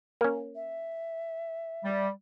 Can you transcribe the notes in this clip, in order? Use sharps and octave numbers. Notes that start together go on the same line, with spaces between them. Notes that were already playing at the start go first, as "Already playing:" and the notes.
A#3 C#4
E5
G3